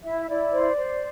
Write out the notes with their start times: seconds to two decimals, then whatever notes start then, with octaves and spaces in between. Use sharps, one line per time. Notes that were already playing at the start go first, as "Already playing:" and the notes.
0.04 E4 E5
0.20 E5
0.28 E4 D5
0.52 C5
0.77 C5